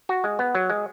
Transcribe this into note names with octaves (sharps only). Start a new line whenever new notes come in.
F#4
G#3
B3
F#3
G#3